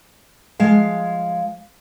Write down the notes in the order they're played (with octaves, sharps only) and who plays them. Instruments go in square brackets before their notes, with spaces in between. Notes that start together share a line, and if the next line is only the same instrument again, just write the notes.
[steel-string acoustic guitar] F3 G#3 F5